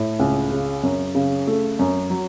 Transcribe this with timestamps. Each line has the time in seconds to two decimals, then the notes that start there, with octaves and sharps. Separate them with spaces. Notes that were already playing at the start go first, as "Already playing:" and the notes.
Already playing: A2
0.19 C#2
0.51 C#3
0.83 F#2
1.15 C#3
1.47 A3
1.79 F#2
2.10 F#3